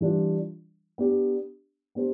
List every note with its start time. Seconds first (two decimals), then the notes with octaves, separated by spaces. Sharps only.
0.01 E3 G3 D4 F4
0.98 B3 D4 G4
1.95 B3 D4 G4 C5